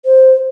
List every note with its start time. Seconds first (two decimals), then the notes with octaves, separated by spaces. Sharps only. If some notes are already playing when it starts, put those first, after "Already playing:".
0.05 C5